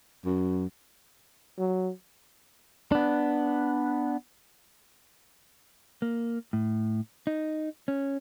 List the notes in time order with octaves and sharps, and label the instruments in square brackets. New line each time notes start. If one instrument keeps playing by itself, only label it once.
[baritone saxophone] F#2
[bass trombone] F#3
[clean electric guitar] B3 D4
A#3
A2
D#4
C#4